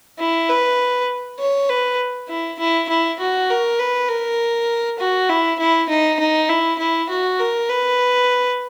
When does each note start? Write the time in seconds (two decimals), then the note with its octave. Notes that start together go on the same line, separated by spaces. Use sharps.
0.19 E4
0.49 B4
1.39 C#5
1.70 B4
2.29 E4
2.59 E4
2.89 E4
3.20 F#4
3.50 A#4
3.80 B4
4.09 A#4
4.99 F#4
5.29 E4
5.59 E4
5.89 D#4
6.19 D#4
6.49 E4
6.79 E4
7.09 F#4
7.39 A#4
7.69 B4